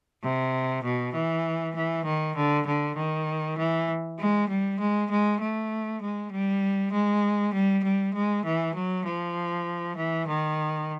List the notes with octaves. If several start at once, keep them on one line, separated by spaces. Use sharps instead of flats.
C3
B2
E3
E3
D#3
D3
D3
D#3
E3
G#3
G3
G#3
G#3
A3
G#3
G3
G#3
G3
G3
G#3
E3
F#3
F3
E3
D#3